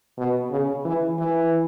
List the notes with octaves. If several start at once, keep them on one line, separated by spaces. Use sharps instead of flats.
B2
C#3
E3
E3